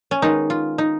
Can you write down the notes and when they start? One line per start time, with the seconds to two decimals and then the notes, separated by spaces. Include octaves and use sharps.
0.11 C#4
0.22 D#3 G#3 B3 D#4
0.50 F4
0.78 D#4